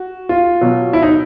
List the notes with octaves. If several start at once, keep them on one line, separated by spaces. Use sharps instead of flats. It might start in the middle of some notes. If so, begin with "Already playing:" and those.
Already playing: F#4
F4
B2 F#3
E4
D#4